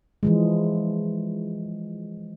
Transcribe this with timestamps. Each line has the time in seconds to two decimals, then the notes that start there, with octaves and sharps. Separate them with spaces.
0.23 E3 F3 G#3